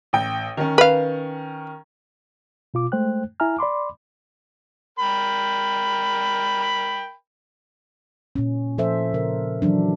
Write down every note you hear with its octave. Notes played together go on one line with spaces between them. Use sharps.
A1 G5
D#3 C#4
B4 F5
B2 F4 D6
G#3 A3 C5 G5 F#6
E4 E5 G#5 A#5 F6
D5 B5 C6 D6
A#4 G5 B5
A#2 C#4
F3 A4 C5 E5
C#3 A#4
D#3 E3 F#3 D4